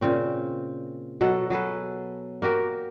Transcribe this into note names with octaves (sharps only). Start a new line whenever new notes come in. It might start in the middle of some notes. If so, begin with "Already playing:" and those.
A#2 C#3 C4 C#4
B2 F#3 A4 F#5
F#3 G#4 A4 B4
A#3 F#4 G4 A#4